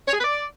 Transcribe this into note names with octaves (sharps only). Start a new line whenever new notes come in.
C#5
G#4
B4
D5